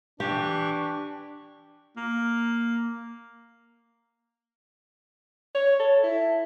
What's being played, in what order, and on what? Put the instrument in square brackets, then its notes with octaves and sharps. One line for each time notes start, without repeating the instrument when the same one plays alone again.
[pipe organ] E3 C#6 [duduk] D4 [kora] G4
[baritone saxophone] A#3
[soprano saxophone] C#5
A4
E4